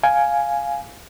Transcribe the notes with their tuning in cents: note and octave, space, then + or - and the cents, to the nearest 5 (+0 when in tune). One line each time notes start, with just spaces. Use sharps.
F5 +0 G#5 +5